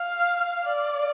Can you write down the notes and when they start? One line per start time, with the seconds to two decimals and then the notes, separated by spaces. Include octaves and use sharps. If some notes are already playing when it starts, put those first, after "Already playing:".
Already playing: F5
0.64 D5